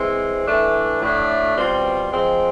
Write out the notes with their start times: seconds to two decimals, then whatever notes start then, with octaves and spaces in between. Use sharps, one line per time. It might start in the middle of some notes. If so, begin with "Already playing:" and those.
Already playing: E3 G#3 C4
0.45 E3 A3 D4
1.01 A2 F#3 A3 D4
1.56 B2 G3 C4 F4
2.12 F3 G#3 C4